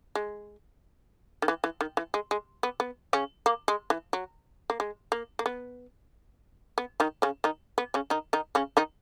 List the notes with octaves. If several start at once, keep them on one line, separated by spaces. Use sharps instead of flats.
G#3
D#3
E3
E3
D#3
E3
G#3
G#3
B3
B3
C#3 C#4
A#3
G#3
E3
F#3
A#3
G#3
A#3
A#3
B3
B3
D#3 D#4
C#3 C#4
D#3 D#4
B3
C#3 C#4
D#3 D#4
D#3 D#4
C#3 C#4
D#3 D#4